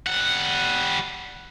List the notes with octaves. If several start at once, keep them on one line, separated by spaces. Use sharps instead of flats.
G3 F#5